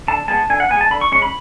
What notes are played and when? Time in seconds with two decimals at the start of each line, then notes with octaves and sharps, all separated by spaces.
0.08 D3 A5
0.28 G#3 B3 A5
0.50 D3 G#5
0.60 F#5
0.70 B3 G#5
0.74 G#3
0.81 A5
0.90 D3 B5
1.01 C#6
1.12 G#3 C#4 C#6
1.22 B5